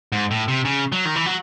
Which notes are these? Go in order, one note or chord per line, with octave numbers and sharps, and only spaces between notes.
G#2
A2
C3
C#3
F#3
D#3
E3
F#3